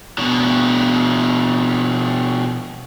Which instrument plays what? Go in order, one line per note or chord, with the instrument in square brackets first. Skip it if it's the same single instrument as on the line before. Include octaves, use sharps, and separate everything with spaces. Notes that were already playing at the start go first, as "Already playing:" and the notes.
[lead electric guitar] B2 D4